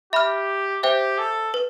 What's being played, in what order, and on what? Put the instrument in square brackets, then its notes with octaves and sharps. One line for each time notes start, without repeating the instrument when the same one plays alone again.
[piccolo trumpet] G4 [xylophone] E5 B5 F6
[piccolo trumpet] G4 [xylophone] C5 E5 G5
[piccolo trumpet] A4
[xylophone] B4